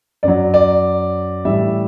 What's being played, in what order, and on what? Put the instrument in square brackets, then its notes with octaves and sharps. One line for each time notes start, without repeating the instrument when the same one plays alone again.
[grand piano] F#2 F#3 D5
D5
A2 E3 G3 E5